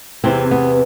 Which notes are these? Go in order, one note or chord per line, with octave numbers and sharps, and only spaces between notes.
E2 C3 E3 C4
B3